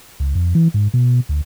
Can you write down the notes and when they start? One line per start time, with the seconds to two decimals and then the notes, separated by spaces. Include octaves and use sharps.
0.20 C#2
0.35 F2
0.55 E3
0.74 G#2
0.94 B2
1.29 D2